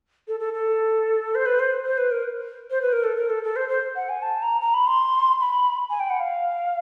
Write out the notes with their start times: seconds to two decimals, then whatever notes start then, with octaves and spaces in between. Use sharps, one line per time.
0.28 A4
0.40 A4
0.53 A4
1.35 C5
1.46 B4
1.59 C5
1.85 C5
1.98 B4
2.11 A#4
2.70 C5
2.82 B4
2.92 A#4
3.04 A4
3.16 A#4
3.30 A4
3.44 A4
3.56 C5
3.69 C5
3.96 F#5
4.09 G#5
4.22 A5
4.42 A#5
4.61 A#5
4.74 B5
4.87 C6
5.40 B5
5.90 G#5
6.00 G5
6.10 F#5
6.20 F5